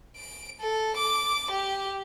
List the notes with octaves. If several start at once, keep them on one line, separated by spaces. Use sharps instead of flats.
D7
A4
D6
G4